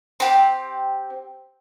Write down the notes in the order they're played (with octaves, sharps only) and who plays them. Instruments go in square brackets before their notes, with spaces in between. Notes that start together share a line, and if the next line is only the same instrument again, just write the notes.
[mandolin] C4 G4